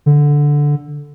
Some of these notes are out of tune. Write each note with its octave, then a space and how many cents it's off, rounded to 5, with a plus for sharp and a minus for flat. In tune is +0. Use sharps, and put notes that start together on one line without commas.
D3 -5